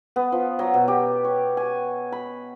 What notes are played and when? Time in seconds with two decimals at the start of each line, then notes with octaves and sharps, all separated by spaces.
0.16 B3
0.32 F3
0.59 F#3
0.74 B2
0.88 G4
1.24 C#5
1.57 G#5
2.12 B5